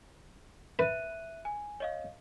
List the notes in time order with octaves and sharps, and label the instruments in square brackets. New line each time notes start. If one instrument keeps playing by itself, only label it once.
[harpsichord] B4 [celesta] E5 F#6 D#7
[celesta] G#5
C#5 D#5 F5